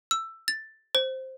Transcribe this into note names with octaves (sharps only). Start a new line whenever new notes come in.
E6
A6
C5